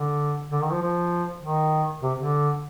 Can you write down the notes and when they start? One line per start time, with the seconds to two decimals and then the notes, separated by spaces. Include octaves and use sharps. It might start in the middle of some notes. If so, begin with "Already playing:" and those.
Already playing: D3
0.51 D3
0.61 D#3
0.71 F3
0.82 F3
1.42 D#3
2.03 C3
2.18 D3